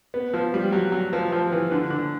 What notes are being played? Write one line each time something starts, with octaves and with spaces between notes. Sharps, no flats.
B3
F3
G3
F#3
F#3
F3
F3
E3
D3
D3